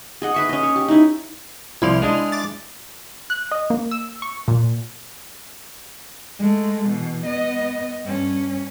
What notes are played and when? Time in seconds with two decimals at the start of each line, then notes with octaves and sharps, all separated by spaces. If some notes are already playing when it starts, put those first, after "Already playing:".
0.22 G#4 D#5 F#5
0.34 B4 E5 C#6
0.49 C#4 D#5
0.63 C#5
0.76 G4
0.88 D#4 E4
1.82 C2 F3 E4 D5 C6 F7
2.02 G#3 D4 D#5
2.32 D6 A6
3.30 F#6
3.51 D#5
3.70 A#3
3.91 E6
4.22 C#6
4.48 A#2
6.39 G#3 A3
6.89 B2 E3
7.25 B3 D#5
8.05 G2 C#4